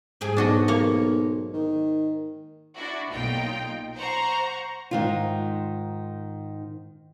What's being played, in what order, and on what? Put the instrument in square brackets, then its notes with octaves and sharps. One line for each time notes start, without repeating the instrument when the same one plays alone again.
[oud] G#2 G4 G#4
[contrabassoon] B1 [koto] D4 F#4 D#5
[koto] A#3 C#5
[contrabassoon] D#3
[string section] D4 E4 F#4
B1 A#2 D#4 F4 G5
C5 F#5 A#5 C#6
[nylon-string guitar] G#2 D#3 F4